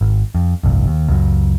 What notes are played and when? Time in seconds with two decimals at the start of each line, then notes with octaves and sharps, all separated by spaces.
0.01 G#1
0.35 F2
0.63 G1 C2 F2
0.87 D#2
1.08 C#2 F#2